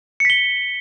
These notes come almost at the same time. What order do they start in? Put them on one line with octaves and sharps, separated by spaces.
C#7 B6 G7